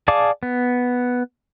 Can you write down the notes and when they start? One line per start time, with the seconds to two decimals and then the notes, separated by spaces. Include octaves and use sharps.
0.08 G#4 D5 F5 A5 D6
0.43 B3